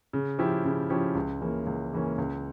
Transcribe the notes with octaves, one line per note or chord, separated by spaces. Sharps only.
C#3
F3 C#4 E4 G4
C#3
F3 C#4 E4 G4
C#2
C#3 E3 A#3 C#4
C#2
C#3 E3 A#3 C#4
C#2